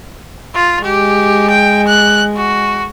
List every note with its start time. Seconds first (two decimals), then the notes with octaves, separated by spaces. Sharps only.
0.55 F4
0.84 G#3 G4
1.50 G5
1.88 F#6
2.37 F#4